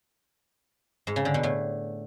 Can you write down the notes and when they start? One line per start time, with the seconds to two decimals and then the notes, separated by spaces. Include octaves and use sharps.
1.07 G#2
1.16 C#3
1.25 D3
1.34 B2
1.43 A2